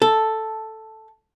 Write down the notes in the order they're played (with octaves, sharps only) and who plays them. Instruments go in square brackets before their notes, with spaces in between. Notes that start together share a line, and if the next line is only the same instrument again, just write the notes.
[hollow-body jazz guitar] A4